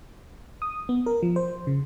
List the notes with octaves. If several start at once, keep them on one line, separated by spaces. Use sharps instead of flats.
D#6
B3
A#4
F3
C5
C#3